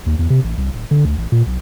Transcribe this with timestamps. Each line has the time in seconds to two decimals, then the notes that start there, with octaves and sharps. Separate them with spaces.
0.06 D#2
0.19 E2
0.30 C3
0.44 A1
0.58 C2
0.74 D1
0.91 D3
1.05 D2
1.18 A1
1.32 A#2
1.47 B1